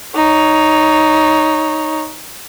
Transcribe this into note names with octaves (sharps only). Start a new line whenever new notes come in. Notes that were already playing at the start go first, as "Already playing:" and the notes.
D#4 C#5